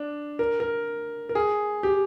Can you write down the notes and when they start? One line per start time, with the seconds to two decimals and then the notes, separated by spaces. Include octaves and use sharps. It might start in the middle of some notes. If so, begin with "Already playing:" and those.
Already playing: D4
0.39 A#4
0.60 A#4
1.29 A#4
1.35 G#4
1.83 G4